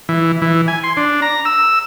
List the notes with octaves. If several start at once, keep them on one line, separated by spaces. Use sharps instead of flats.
E3
E3
G#5
C6
D4
A#5
E6